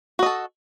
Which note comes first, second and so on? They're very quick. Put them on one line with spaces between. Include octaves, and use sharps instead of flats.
F#4 D#5 A4